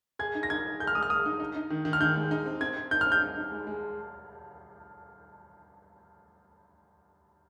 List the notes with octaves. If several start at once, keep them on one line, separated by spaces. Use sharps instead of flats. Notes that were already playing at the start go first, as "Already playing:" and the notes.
G#4 G#6
D#4
A#6
D#4 G#6
G#4
G#4 G6
F6
G#3 D#6
F6
G#3 D#6
D#4
D#4
D#4
D#3
D#3
F6
D#3 G6
G#3
D#4
C4
C4 G#6
C4
D#4 G6
C4 F6
G6
D#4
D#4
G#3
G#3